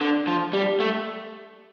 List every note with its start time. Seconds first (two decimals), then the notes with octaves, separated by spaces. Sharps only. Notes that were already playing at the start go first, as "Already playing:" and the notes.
0.01 D3
0.27 F3
0.53 G3
0.80 A3